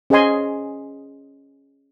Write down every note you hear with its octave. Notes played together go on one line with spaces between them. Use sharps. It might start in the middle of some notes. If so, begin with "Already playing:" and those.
C#4 G#4 C5 D#5 G#5 C6